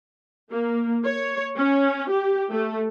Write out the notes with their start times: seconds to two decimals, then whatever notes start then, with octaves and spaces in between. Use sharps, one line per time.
0.51 A#3
1.05 C#5
1.57 C#4
2.10 G4
2.51 A3